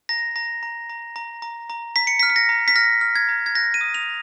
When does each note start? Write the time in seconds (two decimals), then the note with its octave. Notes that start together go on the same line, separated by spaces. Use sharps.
0.09 A#5 A#6
0.36 A#5 A#6
0.63 A#5
0.90 A#5
1.16 A#5
1.42 A#5
1.70 A#5
1.96 A#5 B6
2.07 C#7
2.20 B6
2.23 F6
2.30 B6
2.36 A#6
2.49 A#5
2.68 B6
2.76 F6 A#6
3.01 F6
3.15 G#6
3.29 A#5
3.46 G#6
3.55 F#6 A#6
3.74 D#7
3.81 D#6
3.94 F7